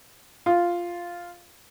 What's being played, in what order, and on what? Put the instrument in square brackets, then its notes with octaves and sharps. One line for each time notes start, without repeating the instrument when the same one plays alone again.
[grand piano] F4